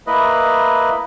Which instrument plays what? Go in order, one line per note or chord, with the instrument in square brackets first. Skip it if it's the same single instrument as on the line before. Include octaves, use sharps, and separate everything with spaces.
[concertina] A#3 E4 B4 D#5